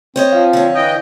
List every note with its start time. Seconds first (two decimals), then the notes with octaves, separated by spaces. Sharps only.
0.16 C4 C5 C#5 D#5
0.32 F3 F5
0.53 D3 C#5
0.75 E3 D#5 G5